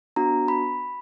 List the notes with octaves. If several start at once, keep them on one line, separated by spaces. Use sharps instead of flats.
B3 D4 F#4 A#5
B5